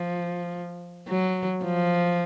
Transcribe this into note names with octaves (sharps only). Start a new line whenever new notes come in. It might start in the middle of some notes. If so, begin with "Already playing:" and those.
Already playing: F3
F#3
F3